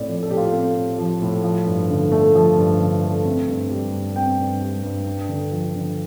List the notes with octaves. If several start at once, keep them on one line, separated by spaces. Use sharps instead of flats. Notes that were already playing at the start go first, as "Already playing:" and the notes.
Already playing: A2 C4 D5
F3
A4
A2 G4
F4
G4
C4 A4
A2
F3
A2
F3
G2
D3
A3
F3
G2
D3
A3
C4
G2
G3
G2
C4 G5
G2
G3
G2
D4
D3
F3
D3